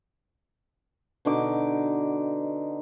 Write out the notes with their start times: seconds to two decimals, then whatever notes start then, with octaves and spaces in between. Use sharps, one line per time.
1.25 B2 D3 D#4 D6